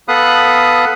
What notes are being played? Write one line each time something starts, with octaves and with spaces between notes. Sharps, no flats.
B3 A4 F5 B5 D#6 F#6